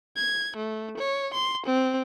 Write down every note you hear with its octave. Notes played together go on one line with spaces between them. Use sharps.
G#6
A3
C#5
C6
C4